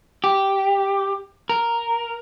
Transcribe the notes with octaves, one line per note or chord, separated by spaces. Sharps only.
G4
A#4